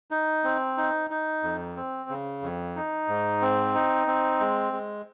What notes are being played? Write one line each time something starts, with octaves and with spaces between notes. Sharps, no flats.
D#4
C4
D#4
D#4
F2
C4
C#3
F2
D#4
G#2
C4
D#4
C4
G#3
G#3